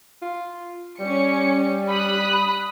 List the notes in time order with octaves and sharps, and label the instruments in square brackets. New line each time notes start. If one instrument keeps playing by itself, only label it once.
[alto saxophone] F4
[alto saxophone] G3 [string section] C#4 C#7
[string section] B5 D#6 F#6